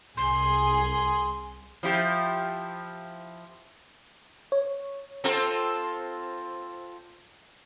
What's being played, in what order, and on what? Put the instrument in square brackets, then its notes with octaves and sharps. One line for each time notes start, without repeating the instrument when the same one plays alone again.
[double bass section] C2 [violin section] G#4 [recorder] C6
[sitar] F3 E4 G4
[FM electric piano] C#5
[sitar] C4 F4 A4